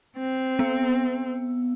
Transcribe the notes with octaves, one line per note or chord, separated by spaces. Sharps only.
C4
B3